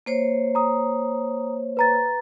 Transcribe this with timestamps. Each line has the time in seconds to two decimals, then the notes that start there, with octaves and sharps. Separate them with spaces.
0.06 A#3 C5 C#5
0.55 A#5 D#6
1.77 B4 A#5 A6